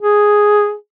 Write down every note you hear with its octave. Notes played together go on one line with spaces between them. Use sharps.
G#4